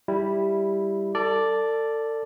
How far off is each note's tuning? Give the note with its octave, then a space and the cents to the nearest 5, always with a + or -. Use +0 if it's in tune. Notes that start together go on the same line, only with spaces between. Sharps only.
G3 +0 E4 +0
A4 +35 D5 +0 A5 +0